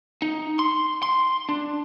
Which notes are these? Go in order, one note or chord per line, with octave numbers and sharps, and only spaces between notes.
D#4
C6
C6
D4